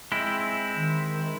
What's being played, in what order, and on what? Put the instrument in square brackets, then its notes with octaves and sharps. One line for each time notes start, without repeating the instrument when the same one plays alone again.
[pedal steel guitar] G#3 C4 E4
[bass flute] D#3